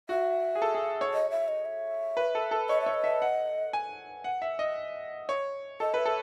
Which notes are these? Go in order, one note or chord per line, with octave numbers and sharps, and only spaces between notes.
F#4 E5
G#4
A4
G#4
C#5
D#5
E5
D#5
E5
B4
A4
A4
C#5 D#5
E5
C#5
D#5
E5
F#5
G#5
F#5
E5
D#5
C#5
A4 D#5
B4 E5
A4